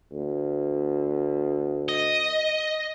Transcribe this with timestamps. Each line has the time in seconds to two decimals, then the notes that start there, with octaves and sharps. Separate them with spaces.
0.12 D2
1.89 D#5